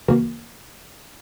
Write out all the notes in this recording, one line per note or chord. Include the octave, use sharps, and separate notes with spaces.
D2 C#3 E3 A#3 F#4 A#4